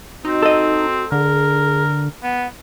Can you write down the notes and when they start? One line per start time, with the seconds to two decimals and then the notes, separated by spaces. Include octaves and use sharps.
0.25 C4 D#4 F#4
0.43 A4 D#5
1.12 D3 G#4 A#4
2.23 B3 F#5